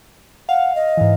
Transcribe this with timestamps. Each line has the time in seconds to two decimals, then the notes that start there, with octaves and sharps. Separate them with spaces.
0.49 F5 F#5
0.75 D#5
0.97 G#2 E3